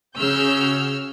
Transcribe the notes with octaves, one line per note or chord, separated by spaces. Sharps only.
C#3 F#4 G#4 E6 F6 G6